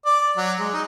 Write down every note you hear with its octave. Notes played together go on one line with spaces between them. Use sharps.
D5
F#3
G#3
D#4